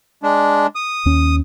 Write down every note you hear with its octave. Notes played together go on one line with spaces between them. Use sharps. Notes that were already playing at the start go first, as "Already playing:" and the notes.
G#3 D4
D#6
D#2 C#4